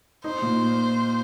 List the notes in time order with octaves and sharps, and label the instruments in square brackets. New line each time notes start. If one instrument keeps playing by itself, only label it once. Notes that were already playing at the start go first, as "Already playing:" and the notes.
[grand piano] D#4 [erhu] C5
[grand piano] A#2